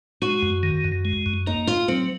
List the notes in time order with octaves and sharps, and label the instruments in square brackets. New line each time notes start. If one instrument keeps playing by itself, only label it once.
[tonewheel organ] G#3 [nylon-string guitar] F#4
[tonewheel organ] F#2
D#3
F#2
G#3
F#2
[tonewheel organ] A#3 [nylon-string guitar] D#4
[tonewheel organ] D#4 [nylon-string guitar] F4
[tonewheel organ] F#3 [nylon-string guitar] C4